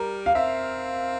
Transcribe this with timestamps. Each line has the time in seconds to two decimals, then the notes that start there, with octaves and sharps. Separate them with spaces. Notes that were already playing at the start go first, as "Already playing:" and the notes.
Already playing: G3 A#4
0.26 F5
0.35 C4 E5